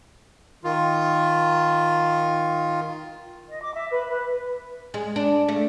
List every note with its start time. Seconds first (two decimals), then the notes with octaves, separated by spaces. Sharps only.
0.64 D#3 F4
3.49 D#5
3.62 D6
3.75 E5
3.90 B4
4.09 B4
4.94 G#3
5.16 D4
5.48 A3